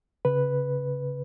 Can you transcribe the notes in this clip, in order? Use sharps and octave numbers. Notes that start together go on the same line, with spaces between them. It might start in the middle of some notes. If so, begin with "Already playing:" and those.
C#3 B4